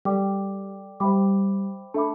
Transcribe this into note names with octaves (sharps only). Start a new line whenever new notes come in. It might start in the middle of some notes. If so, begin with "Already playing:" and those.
G3 A4 D5 G5 D6
G3 C5 E5 G5 B5 D6
A3 D4 A4 E5 B5 D6